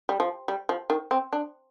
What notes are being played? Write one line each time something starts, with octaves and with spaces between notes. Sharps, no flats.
G3
F3
G3
F3
D#3
C4
D4